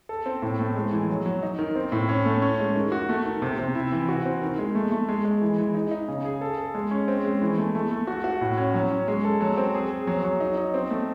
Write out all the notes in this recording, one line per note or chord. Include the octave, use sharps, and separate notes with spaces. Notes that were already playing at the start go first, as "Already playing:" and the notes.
A4
C4
A2
A3
G#3
E3
F#3
F#3
D#4
D#3
C4
A2
C#4
A3
C#4
G#3
D#3
F#4
A3
D#3
C3
C3
E4
E3
F#4
C4
D#3
G#3
A3
A3
G#3
G#3
E3
E3
D#4
D#4
C#3
G#4
A4
A4
G#3
C#4
C4
G#3
E3
A3
A3
A3
F#4
F#4
A2
C#4
F#3
C#4
G#3
A4
F#3
C4
G#4
G#4
F#3
F#3
D#4
D#4
C4
A3